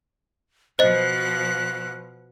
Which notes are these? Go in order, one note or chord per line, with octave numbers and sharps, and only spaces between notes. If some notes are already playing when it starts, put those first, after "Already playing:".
B2 F3 C5 D#5 F#6